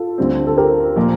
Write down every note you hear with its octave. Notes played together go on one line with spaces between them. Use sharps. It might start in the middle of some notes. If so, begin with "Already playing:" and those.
Already playing: F4 A4
D2 D3 G3 C4
A4
G4 A#4
A#2 F3 A#3